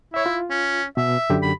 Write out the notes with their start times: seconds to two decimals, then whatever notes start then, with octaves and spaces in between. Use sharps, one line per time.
0.14 E4 C#5 E5
0.26 F4
0.50 C#4
0.97 B2 E5
1.30 F#2 D3 G4
1.43 B5